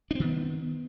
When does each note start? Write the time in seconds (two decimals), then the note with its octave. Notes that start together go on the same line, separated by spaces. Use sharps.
0.11 D4
0.15 C4
0.20 D#3
0.24 B3